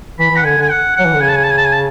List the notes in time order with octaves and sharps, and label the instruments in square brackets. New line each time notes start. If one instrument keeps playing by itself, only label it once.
[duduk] E3 [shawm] B5
[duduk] E3 [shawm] F#5
[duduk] D3 [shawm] G#5
[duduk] D3 [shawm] G#5
[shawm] F#5
[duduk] F#3 [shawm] F#5
[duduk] E3
D3
[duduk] C#3 [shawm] G#5
[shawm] A5
G#5
A5
G#5
A5
G#5
A5